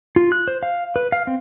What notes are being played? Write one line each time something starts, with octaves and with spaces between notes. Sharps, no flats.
F4
F#6
C5
F5
B4
F5
C4